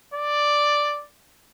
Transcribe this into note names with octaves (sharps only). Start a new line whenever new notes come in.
D5